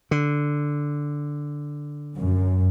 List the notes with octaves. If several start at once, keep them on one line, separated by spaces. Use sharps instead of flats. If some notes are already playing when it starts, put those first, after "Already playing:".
D3
F#2